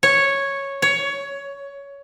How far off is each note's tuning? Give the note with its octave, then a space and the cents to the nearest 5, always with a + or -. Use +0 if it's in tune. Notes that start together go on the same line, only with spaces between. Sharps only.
C#5 -5
C#5 +15